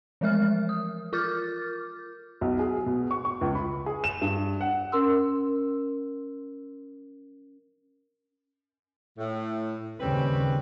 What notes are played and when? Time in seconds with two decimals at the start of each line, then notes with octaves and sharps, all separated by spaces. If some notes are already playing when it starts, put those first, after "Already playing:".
0.21 E3 F3 G#3 A#4 E5 F6
0.69 D#6
1.13 F4 A#4 D6 F6 G6 A6
2.41 B1
2.59 G#4
2.86 B2
3.11 C#6
3.25 C#6
3.41 C#2
3.55 B5
3.86 G#4
4.04 E7
4.21 G2
4.61 F#5
4.92 C#4 A#4 C6 E6
9.17 A2
10.00 D#2 C#3 G3 C4 C#4 B4